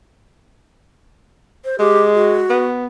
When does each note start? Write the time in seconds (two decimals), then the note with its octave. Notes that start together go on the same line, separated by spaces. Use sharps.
1.65 C5
1.79 G#3 G4
2.14 F#4
2.50 B3